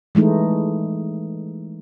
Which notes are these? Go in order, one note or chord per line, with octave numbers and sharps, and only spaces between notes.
E3 G#3 A3 D#4